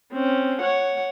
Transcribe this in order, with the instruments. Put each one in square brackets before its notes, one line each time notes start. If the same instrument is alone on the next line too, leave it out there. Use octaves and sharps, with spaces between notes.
[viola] C4 C#4
C#5 F#5